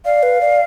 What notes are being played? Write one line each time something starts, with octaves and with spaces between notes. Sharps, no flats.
D5 F5
B4
D5